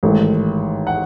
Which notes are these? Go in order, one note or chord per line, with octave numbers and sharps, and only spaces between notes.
A1 G#2 D#3 G#3 A4
F#5